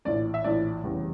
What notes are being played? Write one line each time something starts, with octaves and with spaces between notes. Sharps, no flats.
A#1 A2 E3 D5
E5
A#1 A2 E3 D5
F1 E2 C#3 E3 G3